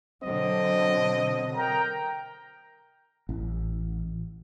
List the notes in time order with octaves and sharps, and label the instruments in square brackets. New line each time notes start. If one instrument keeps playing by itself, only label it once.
[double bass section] B2 D3 F#3 [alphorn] C4 [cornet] D#5
[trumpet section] A#4 G5 A#5
[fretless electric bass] A1